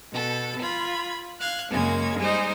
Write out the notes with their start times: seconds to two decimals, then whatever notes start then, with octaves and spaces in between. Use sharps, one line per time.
0.12 B2 A4
0.60 F4 B5 G#6
1.40 F5 F#6 G#6
1.71 F#2 C#3 G#3 A#3 G#6
2.19 G3 G#3 D#4 G#4 C5